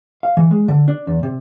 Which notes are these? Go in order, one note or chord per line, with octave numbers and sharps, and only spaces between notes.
F5
E3
G#3
D3
D4
E2
C3